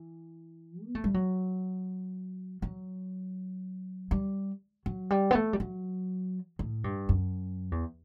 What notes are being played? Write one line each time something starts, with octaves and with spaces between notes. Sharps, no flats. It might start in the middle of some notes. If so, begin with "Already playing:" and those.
Already playing: E3
B3
A3
G3
F#3
F#3
G3
F#3
G3
B3
A3
G3
F#3
A2
G2
F#2
E2